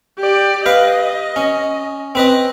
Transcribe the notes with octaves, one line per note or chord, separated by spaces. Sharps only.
G4 D5
B4 D#5 F5
C#4
C4 B4 D#5